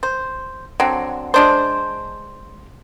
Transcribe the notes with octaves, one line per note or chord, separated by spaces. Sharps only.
C5
D3 F#3 C4
G#3 D4 C5